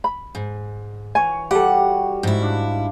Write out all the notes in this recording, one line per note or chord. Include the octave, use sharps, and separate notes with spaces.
B5
G#2
E3 C#5 G#5 C#6
G3 F#4 G4 A4 F#5
G#2 E4
D4 F5